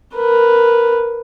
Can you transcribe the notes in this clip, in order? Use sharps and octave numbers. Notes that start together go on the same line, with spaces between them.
A#4 B4